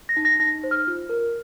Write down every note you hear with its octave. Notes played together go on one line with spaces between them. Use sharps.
A#6
D#4
A#6
D#4 A#6
C5
F6
F4
A#4